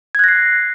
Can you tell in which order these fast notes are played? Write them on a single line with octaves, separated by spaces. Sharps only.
G#6 F#6 A#6 C7